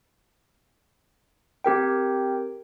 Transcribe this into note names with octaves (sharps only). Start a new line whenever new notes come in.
C4 G4 A#4 G5